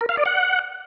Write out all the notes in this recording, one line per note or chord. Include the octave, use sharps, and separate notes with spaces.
A#4
F5
D5
F#5